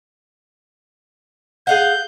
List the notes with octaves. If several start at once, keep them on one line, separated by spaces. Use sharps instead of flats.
G#4 F5 F#5 G6